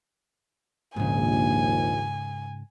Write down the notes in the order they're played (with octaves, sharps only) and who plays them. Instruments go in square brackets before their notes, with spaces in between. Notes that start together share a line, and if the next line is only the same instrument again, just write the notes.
[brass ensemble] A#1 D#2 [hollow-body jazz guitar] G#2 C#3 [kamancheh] G#5